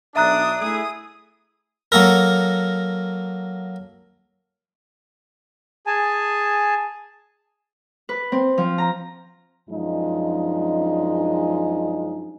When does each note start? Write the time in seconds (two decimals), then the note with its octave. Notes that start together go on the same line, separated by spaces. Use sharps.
0.16 B1 D4 E5 A#5 D#6 F#6
0.61 A3 E4 G#4 D#6
1.92 F#3 A#3 A4 A#4
5.87 G#4 G#5 A5
8.09 B4
8.32 C4
8.58 F3
8.78 A#5
9.70 F#2 F3 G#3 D4 D#4